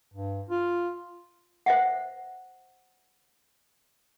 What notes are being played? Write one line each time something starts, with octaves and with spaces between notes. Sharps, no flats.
G2
F4
C5 E5 F#5